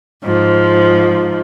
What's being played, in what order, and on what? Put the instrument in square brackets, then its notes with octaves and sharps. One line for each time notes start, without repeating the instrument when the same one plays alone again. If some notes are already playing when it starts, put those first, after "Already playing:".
[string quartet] G#2 F3